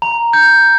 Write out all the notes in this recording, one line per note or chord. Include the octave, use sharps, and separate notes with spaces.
A#5
G6